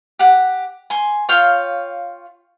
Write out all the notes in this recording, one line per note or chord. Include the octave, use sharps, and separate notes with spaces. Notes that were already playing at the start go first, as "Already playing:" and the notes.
G4 F#5
G#5 C6
F4 C#5 F5 G5